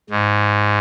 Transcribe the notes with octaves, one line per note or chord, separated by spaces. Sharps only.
G#2